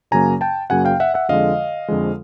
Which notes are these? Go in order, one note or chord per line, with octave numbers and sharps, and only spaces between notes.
F#2 C#3 F#3 A#3 G#5 A#5
G5 A5
F#2 C#3 F#3 A#3 F#5 G#5
F5 G5
E5 F#5
E5 F#5
F2 D3 F3 G#3 D#5 F5
F2 D3 F3 G#3